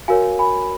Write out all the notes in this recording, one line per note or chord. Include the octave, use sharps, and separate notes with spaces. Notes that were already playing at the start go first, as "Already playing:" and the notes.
F#4 A#4 C#5 F5 G#5
G#5 B5